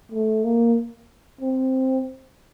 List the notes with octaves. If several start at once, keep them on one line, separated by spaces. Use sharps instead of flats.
A3
A#3
C4